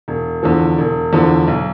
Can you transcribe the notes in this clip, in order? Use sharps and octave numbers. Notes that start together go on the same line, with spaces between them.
E1
E2 D3 F3
E1
E2 D3 F3
B1